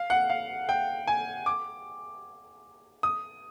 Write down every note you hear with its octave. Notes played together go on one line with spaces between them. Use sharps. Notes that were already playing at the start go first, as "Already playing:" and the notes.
Already playing: F5
F#5
F5
G5
G#5
D6
D#6